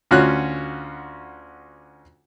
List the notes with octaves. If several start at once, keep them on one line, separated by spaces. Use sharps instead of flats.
D2 C#4 F4 F#4 F#6